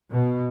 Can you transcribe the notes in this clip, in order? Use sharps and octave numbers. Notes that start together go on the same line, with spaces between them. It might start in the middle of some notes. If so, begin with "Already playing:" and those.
B2